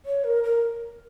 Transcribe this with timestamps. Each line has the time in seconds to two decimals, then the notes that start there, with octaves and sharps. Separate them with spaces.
0.06 C#5
0.24 A#4
0.44 A#4